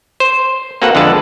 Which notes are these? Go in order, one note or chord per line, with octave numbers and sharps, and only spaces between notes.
C5
A#3 C4 F#4 A4 B4 F#5
F2 D3 G#3 B4 A5